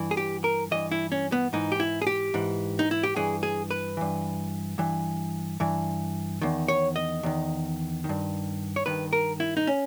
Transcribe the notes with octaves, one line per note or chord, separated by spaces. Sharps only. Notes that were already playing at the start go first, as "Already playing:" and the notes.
Already playing: G2 E3
G#4
G4
A#4
G2 E3 D#5
E4
C#4
B3
G#2 E3 D#4
G4
E4
G#4
G4
G#2 E3
D#4
E4
G4
G2 E3 G#4
G#4
B4
G2 E3
G2 E3
G2 E3
E2 D#3
C#5
D#5
E2 D#3
D#3
G2
C#5
G2 D#3 B4
A#4
E4
D#4
C#4